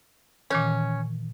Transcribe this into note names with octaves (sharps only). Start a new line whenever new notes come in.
A#2 D#3 E3 C#4